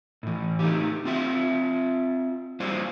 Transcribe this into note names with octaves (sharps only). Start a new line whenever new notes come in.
A2 E3
A3 D#4 G4
C4 F4 E5
G3 A#3 E4 F4 C5 D5